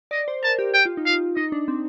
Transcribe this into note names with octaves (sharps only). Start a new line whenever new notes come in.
D5 D#5
C5
A#4 A5
G4
G4 G5
F4
D#4
F4 F5
D#4 D#5
D4
C4